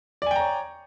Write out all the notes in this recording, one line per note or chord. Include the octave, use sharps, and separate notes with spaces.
C#5 D5 G5 G#5 A#5